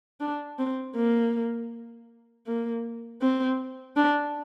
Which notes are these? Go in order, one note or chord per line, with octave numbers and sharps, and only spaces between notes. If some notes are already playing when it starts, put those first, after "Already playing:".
D4
C4
A#3
A#3
C4
D4